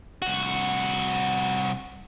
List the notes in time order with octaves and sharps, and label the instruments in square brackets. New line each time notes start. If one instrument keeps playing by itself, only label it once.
[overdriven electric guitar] C2 F#4